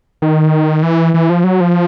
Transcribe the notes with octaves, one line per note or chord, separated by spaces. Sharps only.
D#3
E3
E3
F3
F#3
F3